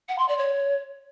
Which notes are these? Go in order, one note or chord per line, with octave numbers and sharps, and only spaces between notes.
F#5
C6
D5
C#5